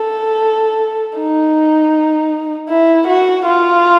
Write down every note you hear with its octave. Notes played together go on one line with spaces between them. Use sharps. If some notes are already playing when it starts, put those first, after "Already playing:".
Already playing: A4
D#4
E4
F#4
F4